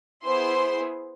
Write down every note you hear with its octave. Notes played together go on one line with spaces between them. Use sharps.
B3 E4 G#4 C5 C6